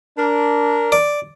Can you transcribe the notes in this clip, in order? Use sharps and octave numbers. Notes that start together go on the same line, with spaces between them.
D4 A#4
D5